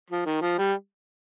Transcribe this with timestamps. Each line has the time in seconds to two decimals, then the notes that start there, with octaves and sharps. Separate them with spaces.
0.10 F3
0.26 D#3
0.42 F3
0.59 G3